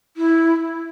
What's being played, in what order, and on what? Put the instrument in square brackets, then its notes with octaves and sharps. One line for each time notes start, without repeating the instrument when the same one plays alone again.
[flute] E4